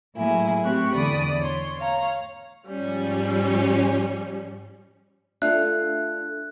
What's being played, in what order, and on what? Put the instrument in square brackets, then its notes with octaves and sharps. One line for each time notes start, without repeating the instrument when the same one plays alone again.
[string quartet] A2 F#3 A#3 E4 G#4
A2 C4 G4 C#6 F#6
E2 D3 D5 B5 D#6
C#5 C6
C#5 F5 A#5
[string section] G#2 F3 G3 C#4
[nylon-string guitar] A3 F4 A4 [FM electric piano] D4 E5 [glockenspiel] F#6